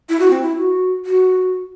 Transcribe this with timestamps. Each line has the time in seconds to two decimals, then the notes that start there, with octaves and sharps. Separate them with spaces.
0.09 E4
0.20 F#4
0.30 C4
0.41 E4
0.57 F#4
1.05 F#4